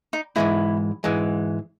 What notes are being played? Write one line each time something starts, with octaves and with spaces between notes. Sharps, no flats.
D#4
G#2 E3 G#3 E4
G#2 E3 G#3